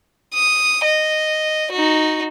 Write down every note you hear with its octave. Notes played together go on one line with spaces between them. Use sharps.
D#6
D#5
D#4 F#4